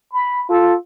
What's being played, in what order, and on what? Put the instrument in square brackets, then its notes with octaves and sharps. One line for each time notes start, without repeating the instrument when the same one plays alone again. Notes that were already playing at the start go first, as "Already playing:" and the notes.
[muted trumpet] B5
[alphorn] F4 [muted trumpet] A4